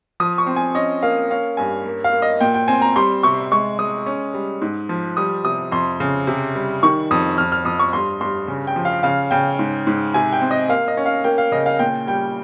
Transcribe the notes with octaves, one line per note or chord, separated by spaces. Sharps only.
F3 D#6
C#6
C4
G#5
C#4 D#5
A#3 F5
C#4 F5
G2 G#5
A#3
F5
A#3
D#5
A#2 G5
G5
C4 G#5
A#5
G3 C6
C3 C#6
G#3 C#6
G#3 D#6
C#4
G3
G#2
F3
G3 D#6
C3 D#6
F2 C6
C#3
C3
G3
D#3 C#6
F2 D#6
F2 F6
F6
F2 D#6
C#6
G2 C6
G2 C6
C#3
G5
F3
F5
C#3 F5
C#3 G5
G#2
G#2
C3 G#5
G5
C4
D#5
A#3 F5
D#5
C#4
F5
A#3 G5
F5
C#3 D#5
F5
A#2 G5
G3 G5